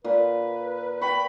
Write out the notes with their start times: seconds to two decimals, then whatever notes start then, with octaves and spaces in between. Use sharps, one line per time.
0.04 A#2 B4
1.01 G5 B5 C#6